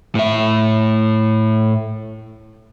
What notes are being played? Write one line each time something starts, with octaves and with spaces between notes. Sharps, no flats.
A2 E5